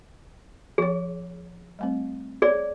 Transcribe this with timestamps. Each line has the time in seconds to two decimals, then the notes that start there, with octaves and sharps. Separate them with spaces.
0.78 F3 G#4 C#5
1.79 G3 A3 C4
2.42 G#4 C#5 D5